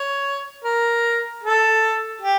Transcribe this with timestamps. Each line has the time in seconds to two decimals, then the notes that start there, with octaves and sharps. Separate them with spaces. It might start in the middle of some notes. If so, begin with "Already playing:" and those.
Already playing: C#5
0.65 A#4
1.43 A4
2.22 G4